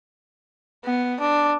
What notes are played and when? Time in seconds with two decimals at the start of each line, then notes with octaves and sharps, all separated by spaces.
0.84 B3
1.20 D4